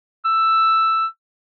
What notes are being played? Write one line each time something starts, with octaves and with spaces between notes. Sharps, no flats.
E6